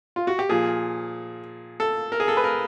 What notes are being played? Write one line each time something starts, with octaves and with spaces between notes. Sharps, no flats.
F4
F#4
G4
A#2 F3 G#4
A4
A#4
G#4
A4
B4
A#4